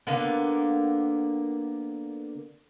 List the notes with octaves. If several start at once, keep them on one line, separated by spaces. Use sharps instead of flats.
D3 A#3 B3